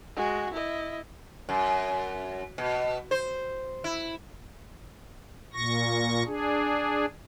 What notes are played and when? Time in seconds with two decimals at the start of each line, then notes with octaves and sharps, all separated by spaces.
0.16 G#3 F#4
0.53 E4 D#5
1.49 F#2
2.58 B2
3.11 C5
3.84 E4
5.53 A#2 C#6 A#6
6.26 D4 G#4